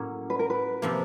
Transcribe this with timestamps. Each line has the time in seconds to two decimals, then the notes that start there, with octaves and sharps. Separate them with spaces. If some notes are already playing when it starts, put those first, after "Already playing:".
Already playing: A2 F#3 A#3 C#4
0.30 B4
0.39 A#4
0.50 B4
0.82 C3 F3 A#3